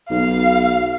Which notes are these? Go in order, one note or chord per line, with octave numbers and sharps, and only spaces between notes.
B1 F5